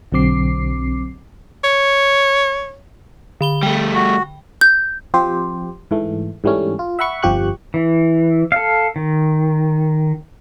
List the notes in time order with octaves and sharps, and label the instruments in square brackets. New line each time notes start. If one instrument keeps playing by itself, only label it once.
[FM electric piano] B1 D3 F#3 C4 D6 C7
[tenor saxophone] C#5
[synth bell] D3 B5 G7
[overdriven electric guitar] G3 A3 [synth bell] G5
[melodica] F#4
[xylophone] G6
[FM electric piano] F3 C4 G4 C5
G#2 E3 A3
G#2 E3 G3 A3 C#4
F4
E5 F#5 B5 C#6
G1 F2 F3 G4 C#6 F#6
[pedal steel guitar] E3
A4 F5
D#3